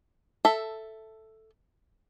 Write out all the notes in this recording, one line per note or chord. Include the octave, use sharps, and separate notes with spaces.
A4 E5